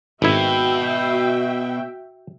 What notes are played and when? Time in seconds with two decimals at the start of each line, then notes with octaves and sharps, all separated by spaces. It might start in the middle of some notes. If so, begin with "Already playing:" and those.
0.22 G#1 B2 E4 F#4 E5 G5